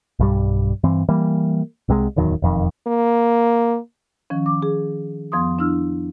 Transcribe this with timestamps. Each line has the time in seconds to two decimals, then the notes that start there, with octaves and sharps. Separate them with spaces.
0.19 B1 G2 G3
0.84 G2 E3 C4
1.09 E3 G3 A#3
1.89 C2 C3 G3 G#3
2.16 D1 E2 D#3 F#3
2.42 E1 F2 D#3
2.87 A#3
4.30 D#3 F3 C#4
4.46 D6
4.62 G#4
5.32 F2 F3 B3 C6 D#6
5.59 D4 E4 E6 F6